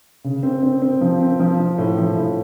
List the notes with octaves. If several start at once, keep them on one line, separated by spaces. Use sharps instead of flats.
C#3
C4
C4
C4
F3
C4
F3
F3
A2
F3
A2